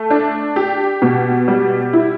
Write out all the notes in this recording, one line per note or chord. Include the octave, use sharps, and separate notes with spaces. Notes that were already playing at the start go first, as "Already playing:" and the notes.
Already playing: A3
D4
G4
B2
G3
E4